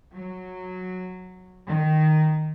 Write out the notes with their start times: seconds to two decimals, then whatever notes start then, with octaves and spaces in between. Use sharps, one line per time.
0.13 F#3
1.67 D#3